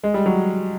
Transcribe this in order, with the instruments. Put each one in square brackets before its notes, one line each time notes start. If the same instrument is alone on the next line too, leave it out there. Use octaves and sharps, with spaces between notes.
[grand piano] G#3
G3
F#3